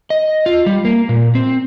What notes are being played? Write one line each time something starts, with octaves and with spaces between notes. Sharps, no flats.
D#5
F4
G3
A#3
A#2
C4